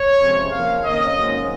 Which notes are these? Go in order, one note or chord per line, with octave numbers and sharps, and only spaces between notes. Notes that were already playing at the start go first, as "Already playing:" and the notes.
Already playing: C#5
F2 C3 F3 G#3 C#4
C#3 F3 A#3 F5
F2 D#3 A#3 C#4 D#5
G#2 F#3 A#3 C#4